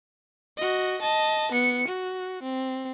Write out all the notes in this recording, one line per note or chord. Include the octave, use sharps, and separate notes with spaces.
F#4 D#5
D#5 A5
B3 C#7
F#4
C4